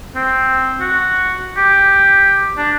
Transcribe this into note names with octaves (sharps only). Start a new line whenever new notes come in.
C4
F#4
G4
D4